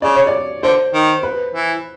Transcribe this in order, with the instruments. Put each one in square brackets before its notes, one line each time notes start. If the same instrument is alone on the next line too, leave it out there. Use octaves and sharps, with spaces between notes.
[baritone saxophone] C#3 [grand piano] D5
[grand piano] C#5
D5
[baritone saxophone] D3 [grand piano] C5
[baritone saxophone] D#3
[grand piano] B4
[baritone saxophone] E3